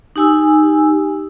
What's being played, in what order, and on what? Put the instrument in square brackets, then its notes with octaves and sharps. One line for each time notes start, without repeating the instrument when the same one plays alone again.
[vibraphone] D#4 G4 G#5 E6